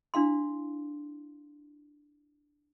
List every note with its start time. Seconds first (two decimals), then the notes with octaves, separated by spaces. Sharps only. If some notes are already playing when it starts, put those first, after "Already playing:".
0.14 D4 E4 F5 C6